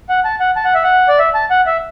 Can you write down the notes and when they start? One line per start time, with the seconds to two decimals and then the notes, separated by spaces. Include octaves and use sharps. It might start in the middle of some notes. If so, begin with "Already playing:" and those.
0.09 F#5
0.24 A5
0.40 F#5
0.56 A5
0.65 F#5
0.74 E5
0.84 F#5
1.08 D5
1.19 E5
1.34 A5
1.50 F#5
1.66 E5